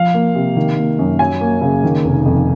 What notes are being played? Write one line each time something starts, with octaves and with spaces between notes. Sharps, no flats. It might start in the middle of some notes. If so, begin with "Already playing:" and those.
Already playing: F3 F5
A#3
C3
D#3
A#3
F#2
F#3 G#5
A#3
C#3
D#3
F1
F2